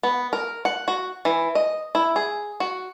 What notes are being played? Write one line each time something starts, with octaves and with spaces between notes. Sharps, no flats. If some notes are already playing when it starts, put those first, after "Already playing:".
B3
A#4
F#5
F#4
E3
D#5
E4
G#4
F#4